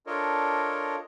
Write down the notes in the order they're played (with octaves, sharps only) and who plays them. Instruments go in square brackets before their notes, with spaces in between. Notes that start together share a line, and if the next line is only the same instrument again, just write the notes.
[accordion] D4 F4 A4 A#4 C#5 D#5